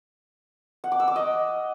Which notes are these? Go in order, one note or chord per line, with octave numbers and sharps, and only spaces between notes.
F#5
D6
E6
D6
D#5